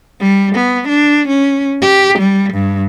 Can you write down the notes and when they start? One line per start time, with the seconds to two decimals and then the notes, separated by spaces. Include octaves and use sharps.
0.20 G3
0.55 B3
0.88 D4
1.28 C#4
1.82 G4
2.19 G3
2.54 G2